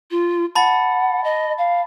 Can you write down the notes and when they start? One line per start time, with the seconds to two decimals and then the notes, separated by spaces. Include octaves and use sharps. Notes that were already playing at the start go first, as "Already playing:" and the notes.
0.11 F4
0.55 F#5 A5 B5 A6
1.24 D#5
1.58 F5